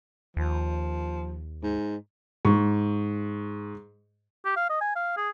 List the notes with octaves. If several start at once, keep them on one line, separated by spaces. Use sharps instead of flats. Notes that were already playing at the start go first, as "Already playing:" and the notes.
D#2 F3
G#2
G#2 C#6
G4
F5
D#5
G#5
F5
G#4